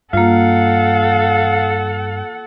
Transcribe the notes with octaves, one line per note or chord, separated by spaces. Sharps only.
G2 A#3 F4 A4 F5 F#5